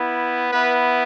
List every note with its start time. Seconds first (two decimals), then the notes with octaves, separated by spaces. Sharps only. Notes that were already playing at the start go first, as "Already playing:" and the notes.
Already playing: B3 E4
0.52 B3 E4 B4